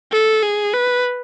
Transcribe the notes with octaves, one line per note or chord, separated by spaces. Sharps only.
A4
G#4
B4